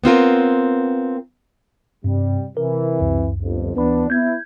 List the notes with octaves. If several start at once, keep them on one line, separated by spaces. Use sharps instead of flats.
B3 C4 F4 A#4
G2 C3 G3
C3 E3 A#4
C#2 F#2
G1 F2
D2 E3 B3 D4 B4 B5
B3 E4 G6 G#6